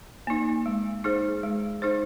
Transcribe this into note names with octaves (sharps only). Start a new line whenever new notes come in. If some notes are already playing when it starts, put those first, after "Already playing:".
A#3 D#4
G#3
D#4 G#4 C5
G#3
D#4 G#4 C5